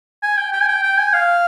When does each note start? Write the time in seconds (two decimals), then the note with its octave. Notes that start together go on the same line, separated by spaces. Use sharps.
0.23 G#5
0.37 G5
0.53 G5
0.61 G#5
0.68 G5
0.83 G5
0.97 G#5
1.13 F5